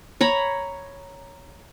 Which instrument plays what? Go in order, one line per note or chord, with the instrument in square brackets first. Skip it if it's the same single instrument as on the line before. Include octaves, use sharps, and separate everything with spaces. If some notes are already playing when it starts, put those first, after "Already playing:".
[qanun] C#5 A#5 B5